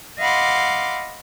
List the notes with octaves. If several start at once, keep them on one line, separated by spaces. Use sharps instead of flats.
D#5 F5 F#5 B5 C6 D6